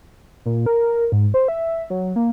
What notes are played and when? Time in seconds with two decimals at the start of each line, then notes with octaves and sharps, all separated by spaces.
0.46 A#2
0.66 A#4
1.12 G#2
1.34 C5
1.48 E5
1.90 F#3
2.16 A#3